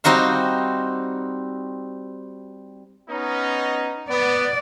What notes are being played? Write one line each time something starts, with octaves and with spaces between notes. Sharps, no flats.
G3 C4 D#4 F#4 F5
B3 C#4 D#4
B3 D5